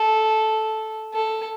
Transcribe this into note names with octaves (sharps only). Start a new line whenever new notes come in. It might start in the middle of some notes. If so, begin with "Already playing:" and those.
Already playing: A4
A4